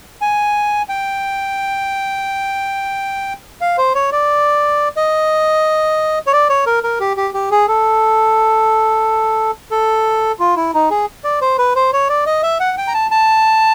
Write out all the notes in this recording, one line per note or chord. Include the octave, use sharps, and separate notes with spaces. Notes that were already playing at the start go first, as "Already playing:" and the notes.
G#5
G5
F5
C5
C#5
D5
D#5
C#5
D5
C#5
A#4
A#4
G4
G4
G4
G#4
A4
A4
F4
E4
D#4
G#4
D5
C5
B4
C5
C#5
D5
D#5
E5
F#5
G5
A#5
A5
A5